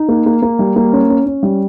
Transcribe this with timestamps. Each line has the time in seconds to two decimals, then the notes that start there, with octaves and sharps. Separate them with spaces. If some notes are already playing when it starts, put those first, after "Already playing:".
Already playing: D#4
0.09 A#3
0.26 A#3
0.42 A#3
0.59 G3
0.76 A#3
0.93 C#4
1.10 C#4
1.26 C#4
1.43 G3